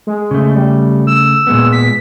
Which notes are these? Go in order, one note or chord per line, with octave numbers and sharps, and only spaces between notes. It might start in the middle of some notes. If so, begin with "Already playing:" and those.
G#3
C#3 A3
G3
E6
A#2 G#3 B3
B6